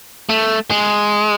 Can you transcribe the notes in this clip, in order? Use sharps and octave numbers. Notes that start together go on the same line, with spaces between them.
A3
G#3